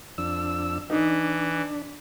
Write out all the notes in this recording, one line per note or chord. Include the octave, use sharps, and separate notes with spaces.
F2 D4 E6
E3 D4 D#4